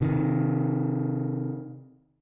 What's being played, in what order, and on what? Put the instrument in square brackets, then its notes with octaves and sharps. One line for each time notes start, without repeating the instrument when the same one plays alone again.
[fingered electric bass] C3 D#3